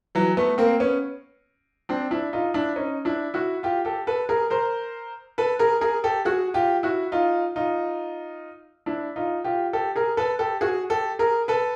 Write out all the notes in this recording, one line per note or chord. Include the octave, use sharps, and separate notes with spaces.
E3 F#3
A3 B3
A#3 C4
B3 C#4
C4 D4
D4 E4
D#4 F4
D4 E4
C#4 D#4
D4 E4
E4 F#4
F4 G4
G4 A4
A4 B4
G#4 A#4
A#4 C5
A4 B4
G#4 A#4
G#4 A#4
G4 A4
F#4 G#4
F4 G4
E4 F#4
D#4 F4
D#4 F4
D4 E4
D#4 F4
F4 G4
G4 A4
G#4 A#4
A4 B4
G4 A4
F#4 G#4
G4 A4
G#4 A#4
A4 B4